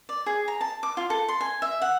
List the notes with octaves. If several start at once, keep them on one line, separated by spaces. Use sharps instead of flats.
D5
G#4
A#5
A5
D6
F4
A4
C6
G#5
E5
F#5